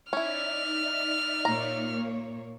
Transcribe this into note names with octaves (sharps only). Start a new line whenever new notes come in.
C#4 D#4 E4 D5 E5 F6
A#2 A#3 C#5 A#5